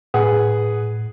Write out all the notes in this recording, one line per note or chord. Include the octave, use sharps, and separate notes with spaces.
A2 G#4 B4 F#5